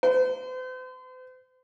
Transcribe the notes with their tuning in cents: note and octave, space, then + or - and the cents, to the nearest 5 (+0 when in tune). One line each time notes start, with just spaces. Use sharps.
C5 -45